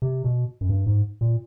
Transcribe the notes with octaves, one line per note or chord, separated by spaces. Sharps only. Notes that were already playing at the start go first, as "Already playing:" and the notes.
C3
B2
F#2
G2
G#2
A#2